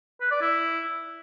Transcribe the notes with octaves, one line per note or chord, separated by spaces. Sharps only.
B4
D5
E4